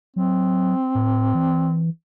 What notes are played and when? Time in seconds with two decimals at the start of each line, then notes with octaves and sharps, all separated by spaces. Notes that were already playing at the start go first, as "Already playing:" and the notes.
0.16 F#3 C4
0.95 A2
1.34 E3